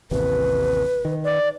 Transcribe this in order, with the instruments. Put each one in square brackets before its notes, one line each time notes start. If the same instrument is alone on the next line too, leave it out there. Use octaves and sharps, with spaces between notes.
[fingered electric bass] A1 D#2 C3 [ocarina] B4
[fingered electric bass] D#3
[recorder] D5